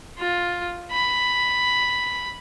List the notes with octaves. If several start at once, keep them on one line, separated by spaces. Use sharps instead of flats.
F4
B5